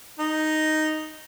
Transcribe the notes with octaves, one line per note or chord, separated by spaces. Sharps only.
D#4